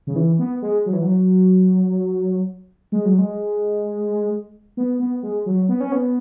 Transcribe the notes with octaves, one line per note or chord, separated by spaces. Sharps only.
C#3
E3
B3
G#3
F#3
E3
F#3
G#3
F#3
G#3
B3
B3
G#3
F#3
B3
C#4
B3